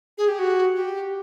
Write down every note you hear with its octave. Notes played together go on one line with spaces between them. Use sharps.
G#4
G4
F#4
G4